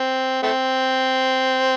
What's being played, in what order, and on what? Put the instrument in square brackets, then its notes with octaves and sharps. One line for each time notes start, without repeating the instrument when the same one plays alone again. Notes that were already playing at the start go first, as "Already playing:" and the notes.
Already playing: [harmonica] C4
A3 C4